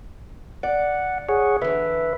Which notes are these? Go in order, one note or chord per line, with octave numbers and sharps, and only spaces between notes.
D5 F#5
G#4 C#5 F#5
D3 E3 B4 E5